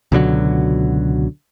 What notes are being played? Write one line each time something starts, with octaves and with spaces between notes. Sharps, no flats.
C#2 B2 D3 F#3